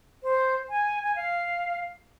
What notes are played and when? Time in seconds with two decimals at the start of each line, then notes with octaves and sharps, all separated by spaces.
0.23 C5
0.69 G#5
1.03 G#5
1.15 F5